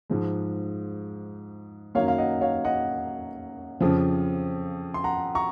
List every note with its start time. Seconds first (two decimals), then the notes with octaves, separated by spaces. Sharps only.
0.10 G#2 F3 G#3
1.95 F#2 D#3 F#3 A#3 C#5 F5
2.08 F5
2.18 D#5 F#5
2.41 C#5 F5
2.65 D#5 F#5
3.81 F2 C#3 F3
4.94 C6
5.04 F#5 A#5
5.35 A#5 C#6